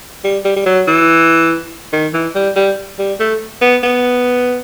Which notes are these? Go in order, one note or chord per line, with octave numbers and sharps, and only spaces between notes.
G3
G3
G3
F#3
E3
D#3
E3
G3
G3
G3
A3
B3
B3